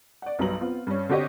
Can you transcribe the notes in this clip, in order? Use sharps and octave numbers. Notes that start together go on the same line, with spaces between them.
D5 F#5
B1 G2 F#3 B4 A#5 F#7
B3 C4 F4
G2 C#4
D3 C4 F#4 G4 C#5 D#5